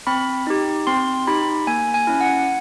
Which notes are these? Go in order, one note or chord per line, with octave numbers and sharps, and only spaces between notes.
C4 B5
D#4 G4
C4 C6
D#4 G4 B5
A#3 G#5
G#5
C#4 E4
F#5